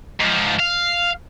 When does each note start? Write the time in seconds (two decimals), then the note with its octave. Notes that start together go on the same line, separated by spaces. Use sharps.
0.20 G#2 F3
0.60 F5